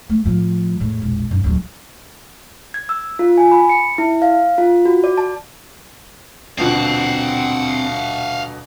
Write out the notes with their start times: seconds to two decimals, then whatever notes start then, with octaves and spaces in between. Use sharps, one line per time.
0.10 A3
0.25 A2 F3
0.80 E2 A2
1.02 E1 A#1
1.31 F#2 C#4
1.44 D1 F#3
2.74 G#6
2.89 E6
3.19 F4
3.38 G#5
3.52 B5
3.69 C#7
3.98 E4
4.22 F5
4.58 F4
4.85 F#4
5.04 D5
5.17 A5
6.58 D#1 B2 D3 C4 F5 F#5